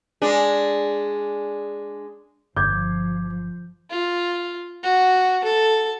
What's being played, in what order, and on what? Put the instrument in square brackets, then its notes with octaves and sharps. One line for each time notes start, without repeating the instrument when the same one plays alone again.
[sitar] G#3 D4
[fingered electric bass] G1 [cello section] F3 [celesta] D6 G#6 [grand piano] G6
[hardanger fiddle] F4
F#4
A4